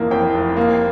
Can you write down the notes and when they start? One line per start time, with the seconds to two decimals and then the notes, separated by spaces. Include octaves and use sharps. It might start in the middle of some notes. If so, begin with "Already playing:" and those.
Already playing: F1 F2 E3 A#3
0.11 F2 G5
0.35 F1
0.57 A#3